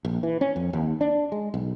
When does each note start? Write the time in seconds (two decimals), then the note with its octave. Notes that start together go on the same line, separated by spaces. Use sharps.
0.05 A#1
0.23 E3
0.41 C#4
0.56 F2
0.73 D#2
1.01 D4
1.32 G#3
1.54 B1